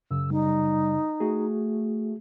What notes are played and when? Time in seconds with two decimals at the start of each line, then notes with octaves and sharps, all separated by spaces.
0.11 F#2 C#3 E6
0.30 G3 D#4
1.20 A3 F#4 G#4